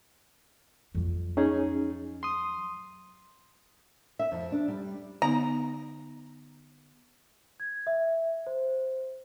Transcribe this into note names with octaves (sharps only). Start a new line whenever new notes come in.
F2 F#3
C#4 D#4 G#4
C6 D#6
E5
F2
D4
G3
D3 B3 D#4 A#5
G#6
E5
C5